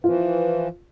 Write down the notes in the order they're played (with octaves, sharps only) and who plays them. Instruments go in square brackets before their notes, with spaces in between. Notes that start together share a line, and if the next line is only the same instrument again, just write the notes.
[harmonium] E3 F3 [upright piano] F4